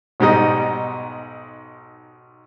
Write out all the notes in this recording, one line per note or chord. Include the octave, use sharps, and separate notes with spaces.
B1 G#2 B2 G3 D#4 D#5